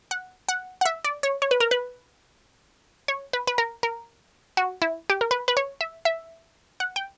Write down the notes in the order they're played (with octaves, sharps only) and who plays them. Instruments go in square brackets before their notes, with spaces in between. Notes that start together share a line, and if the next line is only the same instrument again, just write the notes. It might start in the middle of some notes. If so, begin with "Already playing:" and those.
[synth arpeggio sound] F#5
F#5
F#5
E5
D5
C#5
C#5
B4
A#4
B4
C#5
B4
B4
A#4
A#4
F#4
E4
G4
A#4
B4
B4
C#5
E5
E5
F#5
G5